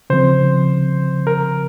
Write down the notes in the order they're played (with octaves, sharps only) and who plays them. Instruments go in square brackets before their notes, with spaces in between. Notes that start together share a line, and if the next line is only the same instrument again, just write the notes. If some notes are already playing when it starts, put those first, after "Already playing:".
[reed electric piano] C#3 F3 C4 [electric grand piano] C5
[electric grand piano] A#4